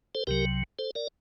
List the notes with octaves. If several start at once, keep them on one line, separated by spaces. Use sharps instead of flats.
A4 C5
C2 C3 F#3 G4 A#4
A4 C5
A#4 D5